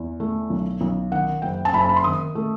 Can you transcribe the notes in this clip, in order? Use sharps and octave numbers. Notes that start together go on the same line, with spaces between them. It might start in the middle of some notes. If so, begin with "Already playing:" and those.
Already playing: E2
A3
B1
B1
D#3 F#5
F#1 G5
A5
F#1 B5
A5
B5
C6
D#3 D#6
A3